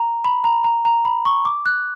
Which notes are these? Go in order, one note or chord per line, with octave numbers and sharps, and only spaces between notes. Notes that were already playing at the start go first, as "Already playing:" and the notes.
Already playing: A#5
B5
A#5
A#5
A#5
B5
C#6
D6
F#6